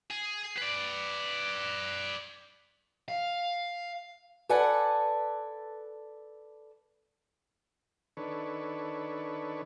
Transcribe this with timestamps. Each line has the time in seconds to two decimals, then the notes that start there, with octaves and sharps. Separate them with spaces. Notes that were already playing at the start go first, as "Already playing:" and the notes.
0.11 G#4
0.57 B4 D5
3.08 F5
4.49 A4 B4 D5 F#5 G#5 A5
8.17 D#3 D4 A4 B4 C#5